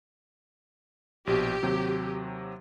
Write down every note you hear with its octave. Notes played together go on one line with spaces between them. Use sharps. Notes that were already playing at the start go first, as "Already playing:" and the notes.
A#1 B2 G4
D#2 C3 F#3